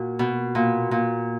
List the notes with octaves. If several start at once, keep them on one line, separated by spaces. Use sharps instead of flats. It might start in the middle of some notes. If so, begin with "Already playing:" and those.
Already playing: A#2 F#4
B2
A#2
A#2